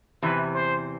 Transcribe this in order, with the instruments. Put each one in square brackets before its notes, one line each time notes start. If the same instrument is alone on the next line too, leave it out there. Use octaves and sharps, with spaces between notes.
[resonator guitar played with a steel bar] E2 C3 E3 [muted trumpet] B4
[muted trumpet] C5